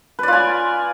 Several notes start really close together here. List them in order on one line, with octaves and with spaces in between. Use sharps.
B4 D5 F4 G#5